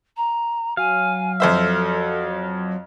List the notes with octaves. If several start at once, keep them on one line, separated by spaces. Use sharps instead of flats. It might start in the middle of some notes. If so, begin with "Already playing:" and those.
A#5
F#3 F5 G#5
F2 A4 C5 E5